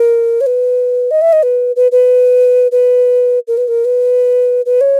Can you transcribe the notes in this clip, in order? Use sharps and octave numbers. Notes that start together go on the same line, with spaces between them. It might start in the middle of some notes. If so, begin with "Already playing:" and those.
Already playing: A#4
C#5
B4
D#5
E5
D#5
B4
B4
B4
B4
A#4
B4
A#4
B4
B4
C#5